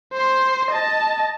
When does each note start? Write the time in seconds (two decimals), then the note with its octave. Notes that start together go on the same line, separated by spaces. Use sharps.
0.13 C5 C6
0.71 D#5 A5